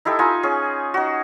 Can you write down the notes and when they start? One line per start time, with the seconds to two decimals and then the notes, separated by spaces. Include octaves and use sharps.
0.05 D#4 E4 G4 A4
0.19 D#4 F4 G#5
0.43 C#4 G#4
0.94 D#4 F#4